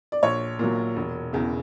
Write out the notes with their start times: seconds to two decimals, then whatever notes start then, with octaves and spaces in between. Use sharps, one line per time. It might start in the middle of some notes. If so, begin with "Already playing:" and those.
0.12 D5
0.23 A#1 C#5
0.59 A#2 F#3
0.96 E1
1.33 E2 C#3